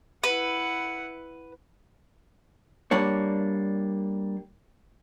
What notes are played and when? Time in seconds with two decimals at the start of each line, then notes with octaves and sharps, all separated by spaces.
0.23 E4 B4 F#5
2.91 G3 A#3 D4 C#5